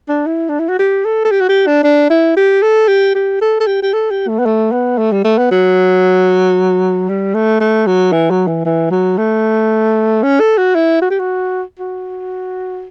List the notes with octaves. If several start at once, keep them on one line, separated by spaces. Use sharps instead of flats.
D4
E4
D4
E4
F#4
G4
A4
A4
G4
F#4
G4
D4
D4
E4
G4
A4
G4
G4
A4
A4
G4
G4
A4
G4
A3
B3
A3
B3
A3
G3
A3
B3
F#3
G3
A3
A3
F#3
E3
F#3
E3
E3
F#3
A3
C#4
A4
F#4
E4
F#4
G4
F#4
F#4